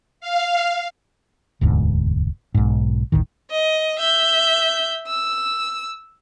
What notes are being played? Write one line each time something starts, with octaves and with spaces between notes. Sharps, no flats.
F5
E1 D2 G#2 B2
B1 G#2
G1 D2 A2 D#3
D#5
E5 G6
E6